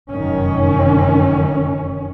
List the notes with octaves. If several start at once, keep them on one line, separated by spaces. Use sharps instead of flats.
F1 F#2 D#3 C#4